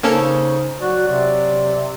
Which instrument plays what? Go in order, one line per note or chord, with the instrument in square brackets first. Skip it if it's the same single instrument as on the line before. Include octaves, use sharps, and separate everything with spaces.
[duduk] C#3 [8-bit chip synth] A#3 C#4 A4 [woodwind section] D#4 C5
[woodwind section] F#3 D5 [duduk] F#4
[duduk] C3